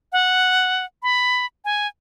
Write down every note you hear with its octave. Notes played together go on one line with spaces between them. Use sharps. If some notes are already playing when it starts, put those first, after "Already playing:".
F#5
B5
G#5